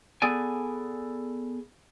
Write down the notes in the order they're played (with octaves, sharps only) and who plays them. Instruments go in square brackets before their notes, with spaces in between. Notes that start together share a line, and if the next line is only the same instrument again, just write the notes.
[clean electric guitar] B3 G#4 A4 D5 G#5